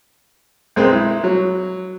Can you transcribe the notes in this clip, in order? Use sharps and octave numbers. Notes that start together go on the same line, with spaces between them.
B1 G#3 C4
E4
F#3